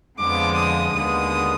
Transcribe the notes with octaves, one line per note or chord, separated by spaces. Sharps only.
F2 D3 F3 G#3 B3 D6
D#6
D#2 D3 G#3 B3 D#6